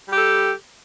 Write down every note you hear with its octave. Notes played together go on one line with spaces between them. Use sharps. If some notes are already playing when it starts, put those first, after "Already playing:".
G3 G4 A4